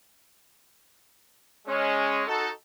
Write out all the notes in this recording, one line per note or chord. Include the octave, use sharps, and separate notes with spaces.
G#3 C#4
D#4 F#4 A4